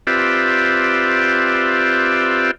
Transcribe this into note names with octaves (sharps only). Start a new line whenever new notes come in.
C4 F4 G4 B4 D5 E5